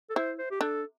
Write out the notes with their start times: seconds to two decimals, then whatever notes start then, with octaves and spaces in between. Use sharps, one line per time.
0.10 A4
0.16 E4 C5
0.39 C5
0.51 G4
0.61 D4 A4